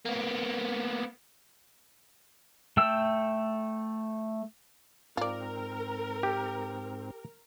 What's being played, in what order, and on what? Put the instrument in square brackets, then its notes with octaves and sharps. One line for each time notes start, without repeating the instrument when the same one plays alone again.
[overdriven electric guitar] A#3 B3
[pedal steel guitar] A3 G5 E6
[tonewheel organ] G#2 C4 [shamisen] F4 D5 [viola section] A#4
[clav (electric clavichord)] G4